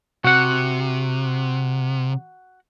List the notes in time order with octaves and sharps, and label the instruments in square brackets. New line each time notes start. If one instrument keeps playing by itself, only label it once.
[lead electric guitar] C3 [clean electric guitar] F#4 F#5